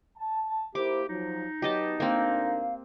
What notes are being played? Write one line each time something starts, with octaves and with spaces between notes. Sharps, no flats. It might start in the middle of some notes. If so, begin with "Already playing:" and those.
A5
A#3 E4 G4 C5 D6
F3 F#3 D#4
F#3 B3 G4 D#5 A5
D2 A#3 C4 D4 A#4 F5